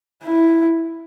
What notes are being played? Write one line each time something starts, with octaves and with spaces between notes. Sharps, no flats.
E4